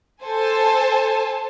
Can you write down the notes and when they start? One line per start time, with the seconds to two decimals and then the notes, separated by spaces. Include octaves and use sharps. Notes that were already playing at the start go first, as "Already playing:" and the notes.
0.23 A4 C5 G#5 A5